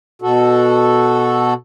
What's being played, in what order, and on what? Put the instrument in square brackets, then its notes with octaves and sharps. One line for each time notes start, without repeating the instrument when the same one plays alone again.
[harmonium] B2 F#4 A4